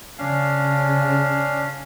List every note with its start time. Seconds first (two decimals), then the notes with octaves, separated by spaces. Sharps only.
0.18 C#3 C#4 D4 F5